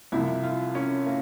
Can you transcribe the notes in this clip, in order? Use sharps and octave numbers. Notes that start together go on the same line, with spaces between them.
C2 C3 F3 E4
F4
C#4
A#3